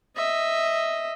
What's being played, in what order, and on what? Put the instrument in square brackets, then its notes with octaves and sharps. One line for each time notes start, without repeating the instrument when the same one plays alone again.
[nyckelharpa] D#5 E5